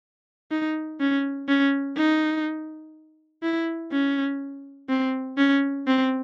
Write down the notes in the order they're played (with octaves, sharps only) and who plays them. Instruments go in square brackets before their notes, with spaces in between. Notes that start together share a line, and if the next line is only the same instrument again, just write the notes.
[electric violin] D#4
C#4
C#4
D#4
E4
C#4
C4
C#4
C4